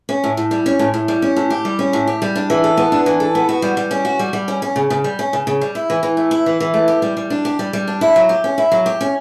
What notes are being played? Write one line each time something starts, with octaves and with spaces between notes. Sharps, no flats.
C#4
A2
A2
G3
C#4
A2
A2
G3
C#4
A2
G4
G3
C#4
A2
G4
G3
D4
E3
A4
B3
D4
E3
A4
B3
F#4
G3
G3
C#4
F#4
G3
G3
C#4
C#4
C#3
C#3
G3
C#4
C#3
C#3
G3
E4
E3
E3
A3
E4
E3
E3
A3
G4
G3
G3
D4
G4
G3
G3
D4
E4
F#3
G4
C#4
E4
F#3
G4
C#4